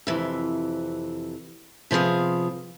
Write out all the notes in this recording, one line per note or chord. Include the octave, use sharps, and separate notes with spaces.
F2 C3 E3
C3 F3 B3 G#4 F5